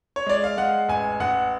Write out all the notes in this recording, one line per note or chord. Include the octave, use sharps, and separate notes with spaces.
C#5
G#3 D5
F5
G#3 F#5
A1 G#5
A1 F#5